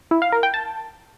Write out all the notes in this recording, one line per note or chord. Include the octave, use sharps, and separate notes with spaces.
E4
F5
A#4
G5
A5